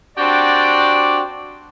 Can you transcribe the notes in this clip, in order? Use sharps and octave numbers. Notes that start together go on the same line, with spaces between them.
C4 D4 F#4 G4 D5